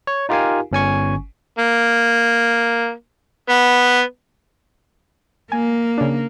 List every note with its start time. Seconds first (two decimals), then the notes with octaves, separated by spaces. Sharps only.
0.07 C#5
0.29 D#4 F4 G4 A#4 F5 G#5
0.72 G1 C#4 G#5 C#6
1.58 A#3
3.49 B3
5.52 A#3 G#5
5.98 C#3 D4